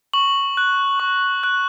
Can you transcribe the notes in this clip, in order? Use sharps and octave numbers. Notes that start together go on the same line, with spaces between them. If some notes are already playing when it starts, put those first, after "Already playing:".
C#6 F#7
F#6
C#6
F#6